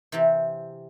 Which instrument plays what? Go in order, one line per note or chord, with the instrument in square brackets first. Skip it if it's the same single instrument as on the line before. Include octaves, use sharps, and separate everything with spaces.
[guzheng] C3 E3 C4 G4